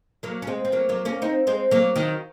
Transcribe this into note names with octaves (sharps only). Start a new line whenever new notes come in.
F#3 A#3
C#4
G#3 C4
C4
F#3 A#3
F#3 A#3
A#3 C#4
C4 D#4
G#3 C4
F#3 A#3
D#3 F#3